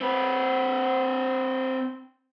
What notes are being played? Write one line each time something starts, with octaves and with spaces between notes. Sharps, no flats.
C4 B4